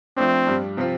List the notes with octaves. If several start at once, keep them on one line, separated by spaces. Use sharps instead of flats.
F3 A3 C4 D4
G2 G3 D4
C3 F3 C4 F4